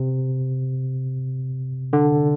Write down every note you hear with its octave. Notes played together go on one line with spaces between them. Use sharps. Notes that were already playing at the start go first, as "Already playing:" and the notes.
Already playing: C3
D3